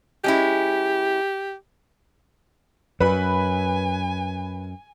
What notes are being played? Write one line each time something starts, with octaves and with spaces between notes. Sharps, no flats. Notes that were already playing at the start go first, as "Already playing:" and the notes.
G#3 C#4 E4 G4
F#2 B4 G#5 B5